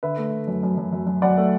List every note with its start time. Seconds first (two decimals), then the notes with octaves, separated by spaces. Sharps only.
0.03 D3 B4 E5
0.17 A3
0.32 D3
0.48 F#2
0.63 F#2
0.78 F#2
0.93 F#2
1.07 F#2
1.22 F#2 D5 F#5
1.37 A3